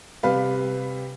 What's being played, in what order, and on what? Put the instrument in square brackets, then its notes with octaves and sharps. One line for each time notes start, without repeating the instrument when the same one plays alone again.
[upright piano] C3 G3 B4 F5